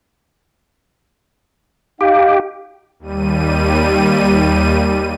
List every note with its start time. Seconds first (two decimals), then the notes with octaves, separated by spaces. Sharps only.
2.01 D#4 G4 F5
2.99 D#2 G3 D#7